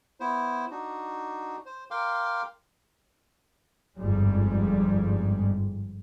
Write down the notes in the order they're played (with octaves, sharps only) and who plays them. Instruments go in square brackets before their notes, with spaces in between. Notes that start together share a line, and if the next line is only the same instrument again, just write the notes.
[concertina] B3 E4 C5
D4 D#4 F#4
C5
A#4 F5 G5 C6 D6
[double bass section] G1 F2 G#2 G3 G#3